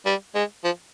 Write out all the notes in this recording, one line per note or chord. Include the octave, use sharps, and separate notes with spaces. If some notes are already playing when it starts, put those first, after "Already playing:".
G3
G#3
F3